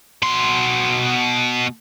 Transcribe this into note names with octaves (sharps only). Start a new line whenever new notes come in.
B2 C6